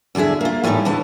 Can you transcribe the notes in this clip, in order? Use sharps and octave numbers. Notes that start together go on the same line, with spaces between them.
E2 D3 D4 G#4 E5
A#3 F4
A2 E3 G3 D4 D#4 G4
D#2 D3 E3 G#3 A5